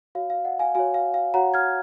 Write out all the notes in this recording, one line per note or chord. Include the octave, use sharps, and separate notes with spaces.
F#4 C#5 F5
F5
D#5 F#5
F5 G#5
F#4 C#5 F5 G#5
F5
F5
F#4 C#5 F#5 A#5
F6 G#6